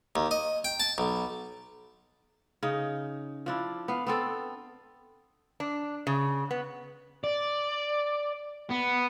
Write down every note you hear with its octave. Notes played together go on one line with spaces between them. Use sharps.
D#2
D#5
G5
A5
B1
C#3 D#4
F3 D4 E4
B3 F5
B3 C4 A4
D4
C#3
B3
D5
B3